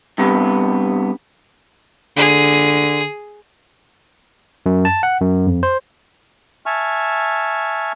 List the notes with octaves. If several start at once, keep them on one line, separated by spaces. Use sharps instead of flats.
G2 C3 B3
D3 G#4
F#2
A5
F#5
F#2
F2
C5
E5 G#5 A5 C#6 F6